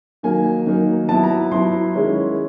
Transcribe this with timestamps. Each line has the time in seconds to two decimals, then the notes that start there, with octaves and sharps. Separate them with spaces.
0.23 D#3 F#3 A#3 D#4 G#5
0.66 D#3 F#3 A#3 D#4
1.09 F#3 B3 E4 A5
1.23 A#5
1.52 F#3 B3 E4 C6
1.94 D#3 G#3 C#4 E4